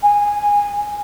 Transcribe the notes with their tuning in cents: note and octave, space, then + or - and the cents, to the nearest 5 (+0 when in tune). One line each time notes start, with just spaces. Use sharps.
G#5 -10